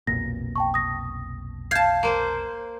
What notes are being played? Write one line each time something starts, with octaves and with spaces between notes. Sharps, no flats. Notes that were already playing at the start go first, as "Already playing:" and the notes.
F1 B1 A#2 A#6
G5 A5 C#6
D#6 A#6
F5 A5 G6 G#6 C7
A#3 C5